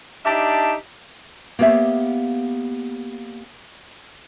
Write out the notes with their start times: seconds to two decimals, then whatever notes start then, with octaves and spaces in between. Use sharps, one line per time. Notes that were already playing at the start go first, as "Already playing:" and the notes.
0.24 D4 D#4 G4 E5 A5
1.59 A#3 B3 G4 C#5 E5 F5